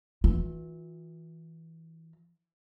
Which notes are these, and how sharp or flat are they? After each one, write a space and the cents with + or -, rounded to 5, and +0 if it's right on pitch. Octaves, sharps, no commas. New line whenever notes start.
E3 -20 F4 +35